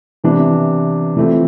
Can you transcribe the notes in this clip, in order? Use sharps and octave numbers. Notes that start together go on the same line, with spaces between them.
C3 E3 B3 D4
E3 A3 C4 F4